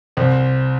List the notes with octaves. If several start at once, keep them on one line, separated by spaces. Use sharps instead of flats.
C2 C4